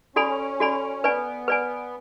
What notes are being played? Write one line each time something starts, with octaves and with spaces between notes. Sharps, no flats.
C#4 F#4 A4 D5 G#5 B5
F#4 A4 D5 G#5 B5
B3 B4 D5 G#5
B4 D5 G#5